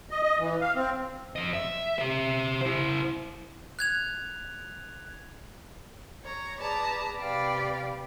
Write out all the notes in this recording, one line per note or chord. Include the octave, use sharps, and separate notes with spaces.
D#5
D#5
E3
F5
C4
F2 D#5
E5
G4 E5
E4 C5
F#6 G#6 F7
C#5 A#5
G#4 B4 D5 A5 A#5
C3 B4 D5 F5 G5